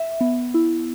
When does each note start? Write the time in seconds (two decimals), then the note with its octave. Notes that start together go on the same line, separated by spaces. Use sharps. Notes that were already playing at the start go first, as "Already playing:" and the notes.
Already playing: E5
0.21 B3
0.54 E4